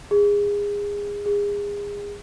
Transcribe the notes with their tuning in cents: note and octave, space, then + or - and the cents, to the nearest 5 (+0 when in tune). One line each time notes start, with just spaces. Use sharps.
G#4 -25
G#4 -30